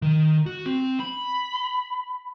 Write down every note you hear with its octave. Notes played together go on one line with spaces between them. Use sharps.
D#3
F#4
C4
B5